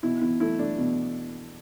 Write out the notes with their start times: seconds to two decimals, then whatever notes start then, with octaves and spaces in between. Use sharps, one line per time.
0.03 B2 E4
0.21 B2 E4
0.40 A3 E4
0.59 A3 D4
0.78 B2